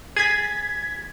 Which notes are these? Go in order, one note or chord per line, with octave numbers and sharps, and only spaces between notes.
G#4 G#6 A6 B6